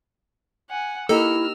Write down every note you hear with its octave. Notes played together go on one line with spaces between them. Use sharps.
F#5 G#5
A#3 D#4 E4 G4 A4 E6 F6